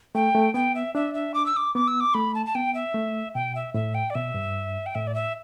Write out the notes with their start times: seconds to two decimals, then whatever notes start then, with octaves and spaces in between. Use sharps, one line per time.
0.15 A3 G5
0.35 A3
0.54 B3 G5
0.75 E5
0.95 D4 E5
1.14 E5
1.34 D6
1.46 E6
1.56 D6
1.75 B3 D6
1.87 E6
2.00 D6
2.14 A3 B5
2.35 A5
2.46 A5
2.55 B3 G5
2.74 E5
2.94 A3
3.35 B2 G5
3.55 E5
3.74 A2 E5
3.94 G5
4.10 D5
4.15 B2 E5
4.34 G2
4.86 G5
4.95 A2 E5
5.07 D5
5.14 E5